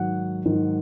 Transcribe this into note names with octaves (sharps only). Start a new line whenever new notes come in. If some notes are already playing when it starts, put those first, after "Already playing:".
Already playing: G#2 D#3 F#3 F#5
G#2 D#3 F#3